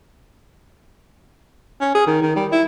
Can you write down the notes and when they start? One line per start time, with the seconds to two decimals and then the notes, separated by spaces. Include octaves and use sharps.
1.81 C#4
1.95 G#4
2.07 D#3
2.22 D#3
2.36 G3
2.52 E4